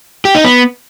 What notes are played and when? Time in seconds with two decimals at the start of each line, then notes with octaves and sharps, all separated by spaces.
0.25 G4
0.35 D#4
0.44 B3